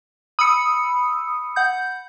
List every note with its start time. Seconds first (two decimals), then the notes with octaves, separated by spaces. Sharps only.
0.39 B5 D#6 E6 C#7
1.56 F#5 G6